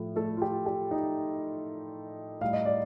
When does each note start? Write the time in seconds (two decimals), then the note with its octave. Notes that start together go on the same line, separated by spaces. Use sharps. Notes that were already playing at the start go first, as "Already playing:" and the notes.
Already playing: A2 F3 A3
0.16 A3 A4
0.37 F4
0.42 G4
0.66 G4
0.91 D#4 D#5
2.41 A2 G3 F5
2.53 D#5
2.66 D5